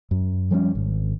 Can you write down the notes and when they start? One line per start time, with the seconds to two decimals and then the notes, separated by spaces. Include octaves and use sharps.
0.11 F#2
0.51 F3 G3 A#3 C#4
0.75 G#1